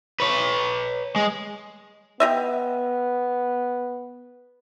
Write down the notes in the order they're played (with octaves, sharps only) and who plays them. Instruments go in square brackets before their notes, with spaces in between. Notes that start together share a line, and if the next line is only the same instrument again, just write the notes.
[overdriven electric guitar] B4 C#5
G#3
[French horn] B3 [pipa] G4 D#5 E5